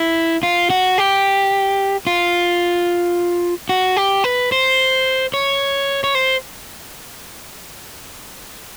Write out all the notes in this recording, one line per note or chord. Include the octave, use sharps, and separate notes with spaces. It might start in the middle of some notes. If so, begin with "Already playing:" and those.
Already playing: E4
F4
F#4
G4
F4
F#4
G4
B4
C5
C#5
C#5
C5